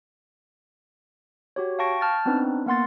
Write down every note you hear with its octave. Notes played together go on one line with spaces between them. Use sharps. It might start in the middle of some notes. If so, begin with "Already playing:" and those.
F#4 G4 C#5
F5 G5 A5 C#6 A#6 D7
A5 F6 G6 A6
B3 C4 D4 D#4 B4
A#3 B3 F#5 C6 A6